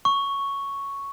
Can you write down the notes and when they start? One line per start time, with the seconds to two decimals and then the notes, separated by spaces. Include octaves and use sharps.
0.05 C#6